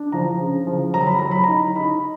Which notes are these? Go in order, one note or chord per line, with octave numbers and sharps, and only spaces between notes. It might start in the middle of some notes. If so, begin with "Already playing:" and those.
Already playing: D4
F3 A#5
C#3
F3
F#3 A#5
B5
F#3 A#5
B5
D#4 A#5
D#4 B5